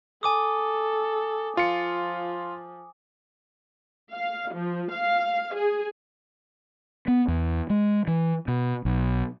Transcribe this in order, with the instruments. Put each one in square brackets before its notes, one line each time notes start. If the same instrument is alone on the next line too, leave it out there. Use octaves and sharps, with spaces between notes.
[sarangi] A4 [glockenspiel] G#5 D6 D#6
[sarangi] F3 [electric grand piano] F4 C#7
[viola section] F5
F3
F5
G#4
[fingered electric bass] B3
E2
G#3
E3
B2
B1